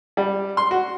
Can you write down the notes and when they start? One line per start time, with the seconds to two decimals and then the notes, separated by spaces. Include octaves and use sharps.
0.17 G3
0.57 C6
0.71 F#4